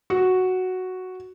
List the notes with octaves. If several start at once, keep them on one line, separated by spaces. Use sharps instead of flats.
F#4